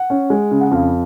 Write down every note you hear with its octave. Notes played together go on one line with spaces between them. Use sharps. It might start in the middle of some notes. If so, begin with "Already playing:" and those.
Already playing: F#5
C#4
G#3
C#3
F#5
F2 F5